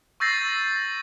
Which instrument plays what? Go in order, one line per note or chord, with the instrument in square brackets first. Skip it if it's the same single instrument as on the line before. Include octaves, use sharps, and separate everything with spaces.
[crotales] C#6 E6 G6 A6 A#6 C7